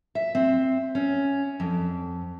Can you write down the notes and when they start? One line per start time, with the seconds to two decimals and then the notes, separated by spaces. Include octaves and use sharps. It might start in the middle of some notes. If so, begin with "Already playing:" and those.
0.15 E5
0.35 C4
0.95 C#4
1.60 F2